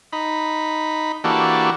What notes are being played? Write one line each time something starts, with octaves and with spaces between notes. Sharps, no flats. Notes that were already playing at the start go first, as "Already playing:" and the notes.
D#4 B5
E3 A#3 D4 F#4 G4 A4